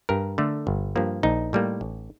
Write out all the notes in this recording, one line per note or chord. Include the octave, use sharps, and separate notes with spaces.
G2 A#4
D3 A3
G1
G2 F3 A#3
A#1 D#4
A2 G3 A#3
A1